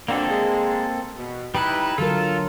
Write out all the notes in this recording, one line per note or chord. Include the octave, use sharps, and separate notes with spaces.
F2 B2 D3 A#3 C4 A4
G#3
B2
G3 D#4 E4 B4
D3 F#3 F4 A4 A#4